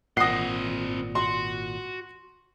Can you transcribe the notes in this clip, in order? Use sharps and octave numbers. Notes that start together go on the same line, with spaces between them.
G#1 A#2 C4 D#5 F#5 D#6 A#6 C7
F#4 C6